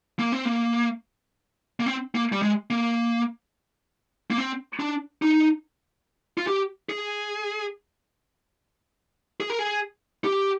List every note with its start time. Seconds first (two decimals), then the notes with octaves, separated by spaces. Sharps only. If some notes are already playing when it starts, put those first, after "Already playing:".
0.19 A#3
0.32 C4
0.45 A#3
1.80 A#3
1.86 C4
2.15 A#3
2.32 G3
2.42 G#3
2.70 A#3
4.30 A#3
4.38 C4
4.80 D4
5.22 D#4
6.38 F4
6.47 G4
6.89 G#4
9.40 G#4
9.50 A#4
9.59 G#4
10.24 G4